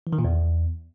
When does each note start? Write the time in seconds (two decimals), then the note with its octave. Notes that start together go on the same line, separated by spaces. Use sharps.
0.07 E3
0.13 D#3
0.19 A#2
0.24 E2